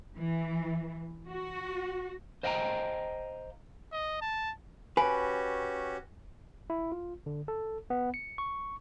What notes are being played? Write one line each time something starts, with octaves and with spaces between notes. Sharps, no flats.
E3
F#4
C5 D#5 F5 G5 A5 A#5
D#5
A5
C#4 F#4 G4 B4 G#5
E4
F4
D3
A4
B3
C#7
C#6